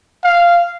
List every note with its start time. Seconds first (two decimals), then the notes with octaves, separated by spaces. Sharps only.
0.24 F5